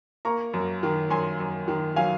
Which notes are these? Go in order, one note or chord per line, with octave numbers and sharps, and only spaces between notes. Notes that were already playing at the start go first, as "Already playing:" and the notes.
A#3 A#5 C#6
F#2
D#3
F#2 G#5 C6
F#2
D#3
F#3 F5 G#5